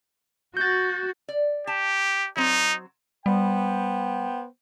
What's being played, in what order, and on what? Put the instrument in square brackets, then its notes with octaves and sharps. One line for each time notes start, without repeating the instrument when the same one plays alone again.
[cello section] F#4 [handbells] G6 A6
[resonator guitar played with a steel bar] D5
[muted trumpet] G4 [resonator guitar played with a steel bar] A5
[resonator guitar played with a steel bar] F#3 C4 [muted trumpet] D#4
[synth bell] G3 [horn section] B3 C5 G5